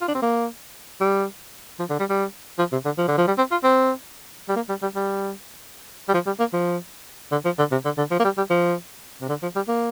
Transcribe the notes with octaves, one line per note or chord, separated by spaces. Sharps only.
F4
D4
C4
A#3
G3
F3
D3
G3
G3
F3
C3
D3
F3
D3
F3
G3
C4
F4
C4
G3
A#3
G3
G3
G3
G3
F3
G3
A#3
F3
D3
F3
D3
C3
D3
D3
F3
A#3
G3
G3
F3
C3
D3
F3
G3
A#3